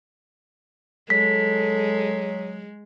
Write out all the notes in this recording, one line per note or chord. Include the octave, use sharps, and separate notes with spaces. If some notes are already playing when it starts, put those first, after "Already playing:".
F#3 G#3 A4 B6